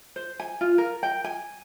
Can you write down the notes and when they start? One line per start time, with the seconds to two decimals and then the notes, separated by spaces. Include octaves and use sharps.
0.16 C5
0.40 G#5
0.61 F4
0.78 A#4
1.03 G5
1.24 G#5